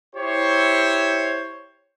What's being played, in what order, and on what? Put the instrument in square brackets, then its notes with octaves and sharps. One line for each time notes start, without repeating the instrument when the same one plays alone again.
[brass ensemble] E4 G4 C5 C#5